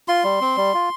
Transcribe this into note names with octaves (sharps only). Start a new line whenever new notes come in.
F4 C6
G3
C4
G3
F4